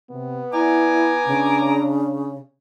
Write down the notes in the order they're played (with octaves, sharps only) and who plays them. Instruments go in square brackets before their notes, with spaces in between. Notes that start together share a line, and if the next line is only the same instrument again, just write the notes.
[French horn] C3 [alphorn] B3
[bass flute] E4 [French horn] D5 [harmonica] G#5 A#5 D6
[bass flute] C#3 [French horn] D4